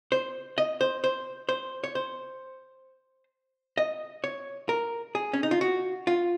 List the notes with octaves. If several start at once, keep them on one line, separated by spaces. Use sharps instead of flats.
C5
D#5
C5
C5
C5
C#5
C5
D#5
C#5
A#4
G#4
C#4
D#4
F4
F#4
F4